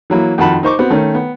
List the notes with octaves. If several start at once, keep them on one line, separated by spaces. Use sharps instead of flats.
E3 F#3 A#3 E4
F2 D#3 F#4 F#5 A5 B5
D#4 C5 C#6 D6
B3 C4 F#4
D#3 A3 C#4
B3